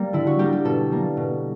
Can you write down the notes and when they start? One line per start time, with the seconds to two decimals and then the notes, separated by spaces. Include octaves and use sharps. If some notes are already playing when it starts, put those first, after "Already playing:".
Already playing: G3 A#3
0.13 D3 E4
0.27 F#4
0.39 G3 A#3 G4
0.52 G4
0.65 B2 A4
0.91 G3 A#3
1.17 B2